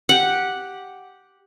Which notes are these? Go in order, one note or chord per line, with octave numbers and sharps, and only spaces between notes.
G4 F#5